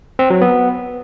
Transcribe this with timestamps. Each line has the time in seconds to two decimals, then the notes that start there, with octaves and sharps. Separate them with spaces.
0.19 C4
0.30 F#3
0.41 B3